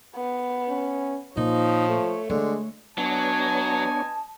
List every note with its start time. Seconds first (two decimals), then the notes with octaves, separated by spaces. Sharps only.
0.17 B3
0.69 C#4
1.37 A#2 F3 D#4 C#5
1.88 A3
2.30 D3 G#3 A3
2.98 F#3 B3 D4 B4 C#5 D#5 G#5 A5